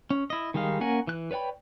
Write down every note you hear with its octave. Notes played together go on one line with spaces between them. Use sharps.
C#4
E4 D#5
D#3 G3 G#3 D#4 F5
A#3 C#4 A#4 F#5 G#5
E3 F#6
B4 C#5 D5 G5 B5